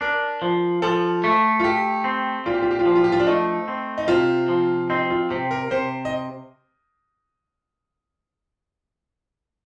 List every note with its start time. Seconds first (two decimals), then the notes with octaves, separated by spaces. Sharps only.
0.01 D4 A#4
0.42 F3
0.82 F3 A4
1.24 A3
1.60 F4
1.63 A3 G4
2.04 C4
2.46 A#2 F4
2.54 G4
2.62 F4
2.71 G4
2.79 F4
2.86 F3 G4
2.96 F4
3.04 G4
3.12 F4
3.20 D4
3.27 A3 D#4
3.68 C4
3.98 D#4
4.08 C3 F4
4.48 F3
4.90 C4 D#4
5.10 F4
5.30 C3 G4
5.51 A#4
5.71 C3 C5
6.05 D#5